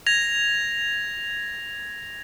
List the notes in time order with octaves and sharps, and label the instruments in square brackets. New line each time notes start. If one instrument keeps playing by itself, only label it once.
[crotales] G#6 A#6 F7